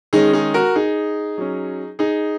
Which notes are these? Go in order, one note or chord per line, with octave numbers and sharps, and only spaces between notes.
D#3 G#3 C#4 D#4 G#4
D#4 G#4
F#4 A#4
D#4 G#4
F#3 C#4
D#4 G#4